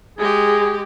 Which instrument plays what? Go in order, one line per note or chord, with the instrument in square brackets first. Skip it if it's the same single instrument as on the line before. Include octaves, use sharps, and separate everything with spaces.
[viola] G#3 G4 [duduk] G#4